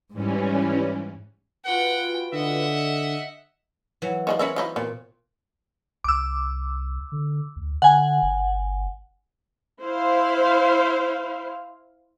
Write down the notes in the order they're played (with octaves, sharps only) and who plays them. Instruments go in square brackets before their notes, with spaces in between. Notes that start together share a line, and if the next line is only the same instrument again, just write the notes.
[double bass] G#2 [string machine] E3 G3 C#4
[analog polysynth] F4 F#4 B4 [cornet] F#5 [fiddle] G5
[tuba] D3 [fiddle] D#5 F#5 [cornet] E5
[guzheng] E3 F#3
[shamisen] D#3 G#3 D4
[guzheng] C4 C#5 B5 [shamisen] C#4 A#4 E5
[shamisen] F#3 D#4 E4
[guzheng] A#2 [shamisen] B3
[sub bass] C2 [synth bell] D6 E6
[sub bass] D3
D2
[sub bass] D3 [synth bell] F#5 G#5
[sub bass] G1
[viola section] E4 C5 F5